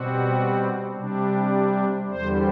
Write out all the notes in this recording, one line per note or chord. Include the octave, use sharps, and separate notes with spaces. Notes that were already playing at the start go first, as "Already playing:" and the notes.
Already playing: B2 G3 C4 F#4
C3 G3 D4
E2 D3 G3 C5